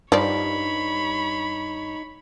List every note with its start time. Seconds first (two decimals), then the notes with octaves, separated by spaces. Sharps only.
0.12 G2 F3 G3 D#4 C#5 D5 B5